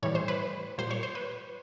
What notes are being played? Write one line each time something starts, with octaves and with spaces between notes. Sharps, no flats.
A2 E3 G3 C#5
C5
B4
A#2 G3 C5
C#5
C5
B4